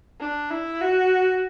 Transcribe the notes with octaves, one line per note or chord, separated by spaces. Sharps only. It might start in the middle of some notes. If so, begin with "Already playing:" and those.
D4
E4
F#4